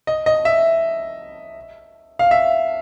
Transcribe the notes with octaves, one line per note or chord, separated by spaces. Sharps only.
D#5
D#5
E5
F5
E5